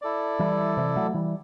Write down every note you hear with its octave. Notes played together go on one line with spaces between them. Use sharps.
E4 A4 D5
E3 G3
C3 E3
F#3 A3
E3 G3